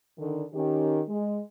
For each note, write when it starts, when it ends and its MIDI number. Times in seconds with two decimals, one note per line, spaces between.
0.18 0.43 50
0.18 0.43 51
0.53 1.00 51
0.53 1.00 61
0.53 1.00 67
1.08 1.40 56